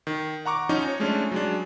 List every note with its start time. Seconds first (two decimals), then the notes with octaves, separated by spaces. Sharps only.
0.07 D#3
0.46 F#5 A#5 C#6 D6
0.69 F3 C#4 D#4
0.88 C#5
1.00 F3 G#3 A3 C#4 D4
1.32 F#3 G#3 D4